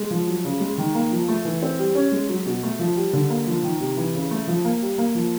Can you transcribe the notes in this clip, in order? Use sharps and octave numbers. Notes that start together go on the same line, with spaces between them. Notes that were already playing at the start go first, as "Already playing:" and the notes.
Already playing: G#3
F3
F#3
C#3
G#3
D#3
A#3
F3
A3
E3
C4
G3
C#4
G#3
F#3
B2
A3
F3
G3
D3
A#3
F3
D#3
C3
E3
C#3
A3
F3
A#3
G3
A#3
F3